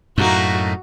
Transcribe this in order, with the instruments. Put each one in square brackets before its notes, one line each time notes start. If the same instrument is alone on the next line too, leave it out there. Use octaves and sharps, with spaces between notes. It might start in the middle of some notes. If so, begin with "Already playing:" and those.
[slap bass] F#2 A2 [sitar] A3 A#3 D#4 [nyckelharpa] F#4